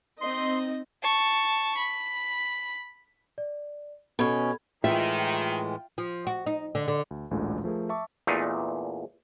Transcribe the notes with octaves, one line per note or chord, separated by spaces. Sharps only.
C4 D#4 D#5 C6
A5 C#6
B5
D5
B2 C#4 A4 B5 G#6
A2 D#3 E3 G#3 F4 E5 G5 F6
F3
F#4
D#4
D3
D3
D2
A1 D2 A#2 D3 G#3
F3 A3 G#4 A#4
E5 A5 C#6 D6
E2 A#2 A3 D4 D#4